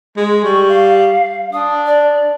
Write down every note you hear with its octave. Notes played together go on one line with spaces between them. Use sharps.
G#3
G3 C#6
F5
D4 D#6
D5